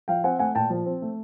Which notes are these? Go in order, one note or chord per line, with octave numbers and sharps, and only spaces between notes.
F3 F5 G5
C4 F#5 G#5
A3 F#5 G#5
A#2 G5 A5
F3
C4
A3